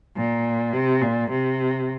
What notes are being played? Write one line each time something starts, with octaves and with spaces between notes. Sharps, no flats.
A#2
C3
A#2
C3